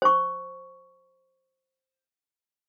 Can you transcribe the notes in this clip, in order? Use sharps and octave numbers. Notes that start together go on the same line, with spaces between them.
C5 C#6